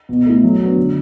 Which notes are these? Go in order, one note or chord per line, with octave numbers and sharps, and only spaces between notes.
B2
A3 E4
F#3
B3 D4 F#4
D3